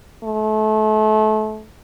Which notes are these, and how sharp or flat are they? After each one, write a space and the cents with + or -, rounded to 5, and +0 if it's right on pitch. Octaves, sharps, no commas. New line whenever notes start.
A3 -30